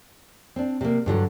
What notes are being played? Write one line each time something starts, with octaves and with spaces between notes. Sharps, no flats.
C4 D4
C3 A#3
G2 D3 F3 F#3